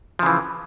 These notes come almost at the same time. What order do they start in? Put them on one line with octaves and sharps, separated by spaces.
F3 C#3 E3